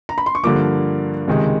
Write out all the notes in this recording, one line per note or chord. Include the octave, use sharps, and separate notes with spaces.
A#5
B5
C6
C#6
G2 D3 F3 A#3 D6
C#2 C3 D#3 G#3